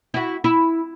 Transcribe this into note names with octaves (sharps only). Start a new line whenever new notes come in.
E4 F#4
E4